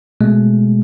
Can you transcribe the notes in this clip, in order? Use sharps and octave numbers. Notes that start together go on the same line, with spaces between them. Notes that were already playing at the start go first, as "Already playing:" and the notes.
B2 G#3 A3